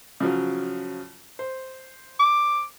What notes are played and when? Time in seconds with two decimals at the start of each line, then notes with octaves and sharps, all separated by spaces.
0.20 C#3 F3 F#3
1.39 C5
2.19 D6